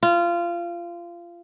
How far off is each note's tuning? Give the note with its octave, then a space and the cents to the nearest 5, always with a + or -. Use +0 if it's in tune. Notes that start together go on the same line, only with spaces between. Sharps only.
F4 -20